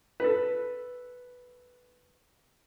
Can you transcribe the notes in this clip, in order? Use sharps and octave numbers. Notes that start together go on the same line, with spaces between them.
A4 B4